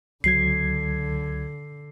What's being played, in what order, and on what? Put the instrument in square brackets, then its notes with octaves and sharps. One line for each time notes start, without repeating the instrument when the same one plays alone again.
[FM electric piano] C#2 F#3 G#6 [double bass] D3 [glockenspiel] C7